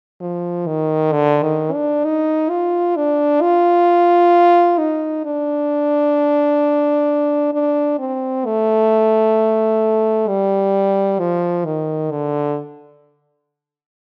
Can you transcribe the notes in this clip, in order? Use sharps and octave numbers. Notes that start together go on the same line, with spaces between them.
F3
D#3
D3
D#3
D4
D#4
F4
D4
F4
D#4
D4
D4
C4
A3
G3
F3
D#3
D3